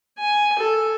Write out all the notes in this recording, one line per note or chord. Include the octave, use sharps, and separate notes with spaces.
G#5
A4